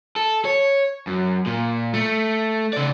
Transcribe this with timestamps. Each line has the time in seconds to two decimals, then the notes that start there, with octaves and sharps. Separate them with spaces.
0.16 A4
0.45 C#5
1.07 F#2
1.46 A#2
1.94 A3
2.73 C#3 D5